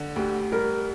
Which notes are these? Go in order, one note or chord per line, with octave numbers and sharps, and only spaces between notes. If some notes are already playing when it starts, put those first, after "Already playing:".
Already playing: D3
D2 G4
G3 A#4